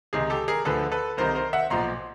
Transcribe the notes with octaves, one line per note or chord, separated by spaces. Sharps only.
C#2 C3 D#3 G#4
G4 A4
G#4 A#4
D2 D3 F3 A4 B4
A4 B4
C2 C3 D#3 A#4 C5
A#4 C5
E5 F#5
B1 A#2 F3 A#5 C6